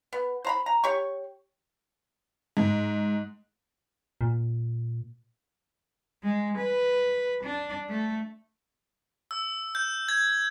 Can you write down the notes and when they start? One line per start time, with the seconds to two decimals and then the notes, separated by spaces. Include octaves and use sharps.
0.13 B3
0.45 C5 A#5 B5
0.66 A#5
0.84 G4 C#5 C#6
2.57 G#2
4.21 A#2
6.23 G#3
6.58 B4
7.44 D4
7.89 A3
9.31 E6
9.75 G6
10.08 G#6